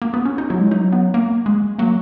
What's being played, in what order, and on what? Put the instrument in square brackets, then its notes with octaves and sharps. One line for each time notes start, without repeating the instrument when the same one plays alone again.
[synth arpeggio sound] A#3
B3
C#4
D#4
[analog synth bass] F#3 [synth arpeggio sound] E4
[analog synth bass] G#3
[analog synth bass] F#3 [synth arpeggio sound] D#4
[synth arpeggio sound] B3
A#3
G#3
[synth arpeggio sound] F#3 [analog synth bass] A#3